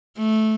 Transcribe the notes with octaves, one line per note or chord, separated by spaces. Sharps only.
A3